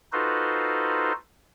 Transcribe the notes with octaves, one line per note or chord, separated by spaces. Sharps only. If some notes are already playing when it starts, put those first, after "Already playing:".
D#4 F4 F#4 A4 B4 C5